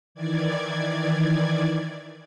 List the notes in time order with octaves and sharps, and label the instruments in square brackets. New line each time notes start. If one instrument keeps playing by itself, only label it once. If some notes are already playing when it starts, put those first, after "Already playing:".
[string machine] D#3 E3 D5 G#6